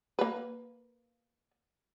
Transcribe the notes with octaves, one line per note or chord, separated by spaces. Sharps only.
A#3 B4